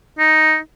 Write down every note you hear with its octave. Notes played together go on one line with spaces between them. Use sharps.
D#4